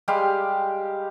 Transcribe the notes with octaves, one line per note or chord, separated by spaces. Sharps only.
G3 G#3 G4 F5